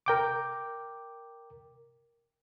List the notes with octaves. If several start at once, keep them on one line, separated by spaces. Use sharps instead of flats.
A#4 G5 D6